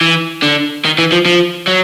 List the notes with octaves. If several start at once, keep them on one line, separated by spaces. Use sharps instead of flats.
E3
D3
D#3
E3
F3
F3
F#3